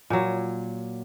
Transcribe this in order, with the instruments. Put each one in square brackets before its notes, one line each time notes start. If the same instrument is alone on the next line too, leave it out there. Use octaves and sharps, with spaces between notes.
[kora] A#2 F#3